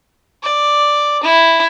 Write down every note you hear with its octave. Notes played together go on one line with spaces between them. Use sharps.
D5
E4